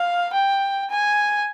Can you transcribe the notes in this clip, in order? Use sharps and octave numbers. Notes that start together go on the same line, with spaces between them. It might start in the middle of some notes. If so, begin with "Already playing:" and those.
Already playing: F5
G5
G#5